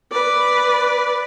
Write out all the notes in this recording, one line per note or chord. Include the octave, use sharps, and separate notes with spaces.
B4 D5